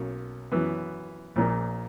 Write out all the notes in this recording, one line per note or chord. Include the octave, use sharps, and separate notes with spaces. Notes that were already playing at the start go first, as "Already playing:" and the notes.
Already playing: B1 B2 A#3 C#4
F#2 E3 B3
A#1 A#2 A#3